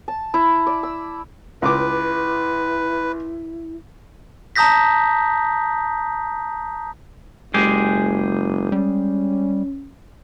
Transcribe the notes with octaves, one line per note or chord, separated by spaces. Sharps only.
A5
E4
D5
E6
C#2 E4 B4 D6
A5 A#5 D#6 G6 A#6 B6
F#1 G#3 G4 G#4
G3 C#4